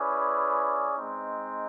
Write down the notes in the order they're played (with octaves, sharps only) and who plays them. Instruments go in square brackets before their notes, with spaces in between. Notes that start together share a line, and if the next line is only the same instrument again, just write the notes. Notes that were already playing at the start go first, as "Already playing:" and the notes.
Already playing: [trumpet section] C#4 E4 G#4 B4 D5
G#3 C4 D#4